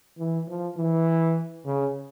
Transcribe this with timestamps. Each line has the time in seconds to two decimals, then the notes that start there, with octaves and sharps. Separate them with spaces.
0.18 E3
0.48 F3
0.77 E3
1.65 C#3